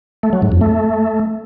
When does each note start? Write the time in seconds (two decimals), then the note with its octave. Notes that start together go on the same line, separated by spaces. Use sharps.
0.23 A3
0.33 F#3
0.42 G#2
0.52 F2
0.61 A3